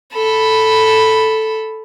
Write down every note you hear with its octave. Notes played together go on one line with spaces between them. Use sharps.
A4 B5